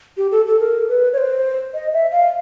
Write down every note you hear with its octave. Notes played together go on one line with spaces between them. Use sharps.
G4
A4
A4
A#4
B4
C#5
C5
D#5
E5
F5